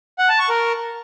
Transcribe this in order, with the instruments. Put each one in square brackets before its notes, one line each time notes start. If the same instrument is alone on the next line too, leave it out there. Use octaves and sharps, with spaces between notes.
[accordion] F#5
A5
C#6
A#4